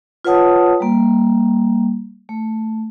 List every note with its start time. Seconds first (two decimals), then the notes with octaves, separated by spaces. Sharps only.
0.25 F4 B4 C#5 F#5 A5 D#6
0.80 G3 A#3
2.29 A3